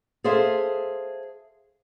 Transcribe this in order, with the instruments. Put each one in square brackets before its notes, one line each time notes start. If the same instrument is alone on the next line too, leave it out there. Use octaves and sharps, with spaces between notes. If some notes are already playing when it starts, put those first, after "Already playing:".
[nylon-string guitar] G#4 A4 C5 E5 F5